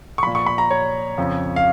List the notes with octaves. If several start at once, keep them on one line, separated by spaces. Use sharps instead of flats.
C#6
A#2 F3 B5
C#6
B5
A#5
C#5
F2 C#3 F3
F5